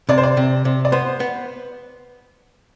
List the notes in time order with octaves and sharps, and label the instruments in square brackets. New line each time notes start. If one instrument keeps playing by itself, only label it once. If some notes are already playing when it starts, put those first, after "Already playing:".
[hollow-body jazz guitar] C3 [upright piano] D5
[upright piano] C5
D5
[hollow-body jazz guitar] C3
C3
[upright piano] D5
[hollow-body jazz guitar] B3 [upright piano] C5
[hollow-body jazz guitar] B3